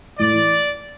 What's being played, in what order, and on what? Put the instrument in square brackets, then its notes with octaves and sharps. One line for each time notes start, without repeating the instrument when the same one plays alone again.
[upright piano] A2 [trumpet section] D5
[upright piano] E3